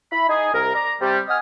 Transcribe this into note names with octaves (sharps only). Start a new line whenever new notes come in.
E4 B5
D#4 G#4
C2 A#4
D5 A#5
C3 G3
D#5 F#5 G#5 D#6 F6